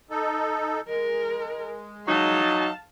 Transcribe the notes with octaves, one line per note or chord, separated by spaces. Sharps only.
D#4 A4
G#3 A#4
F#3 D#4 F5 A5